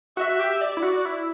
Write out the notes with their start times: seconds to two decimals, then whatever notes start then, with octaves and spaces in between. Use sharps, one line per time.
0.17 F#4 E5
0.39 G4
0.61 D5
0.77 E4
0.83 F#4
1.05 E4